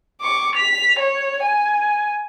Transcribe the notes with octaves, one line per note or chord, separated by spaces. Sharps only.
C#6 D6
B6 F7
C#5
G#5